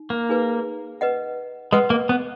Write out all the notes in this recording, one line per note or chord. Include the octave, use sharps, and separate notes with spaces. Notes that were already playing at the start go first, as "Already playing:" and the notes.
Already playing: D#4
A#3
D#4 G#4 B4
B4 D#5 F#5
G#3 B4 D#5 F#5
A#3
B3